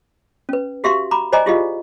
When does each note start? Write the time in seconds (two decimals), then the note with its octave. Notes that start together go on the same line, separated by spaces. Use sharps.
0.49 C#4 B4
0.84 F#4 G4 E5 F5 C6 C#6
1.11 A#5 B5 D6
1.33 C5 D5 D#5 G#5 A#5 D6
1.46 E4 F4 G4 G#4 D#5 F5